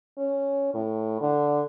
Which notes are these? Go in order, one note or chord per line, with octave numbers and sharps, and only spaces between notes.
C#4
A2
D3